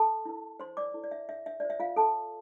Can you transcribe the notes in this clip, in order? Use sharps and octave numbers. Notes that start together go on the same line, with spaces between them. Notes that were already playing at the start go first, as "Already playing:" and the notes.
Already playing: A4 A5
E4 A#4
C5 C6
D5 D6
E4 A4 C5
D5
E5
E5
E5
F4 C5 D5
E5
F4 F5
A4 A5